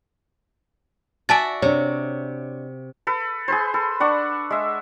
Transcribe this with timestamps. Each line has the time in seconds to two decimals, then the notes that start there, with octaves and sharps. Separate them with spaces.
1.29 F#4 D5 E5 G#5 A5 A6
1.62 C3 D4 C#5
3.07 A4 B4
3.48 G#4 B4 C5
3.74 A4
4.00 D4 F#5 C#6
4.50 G#3 E5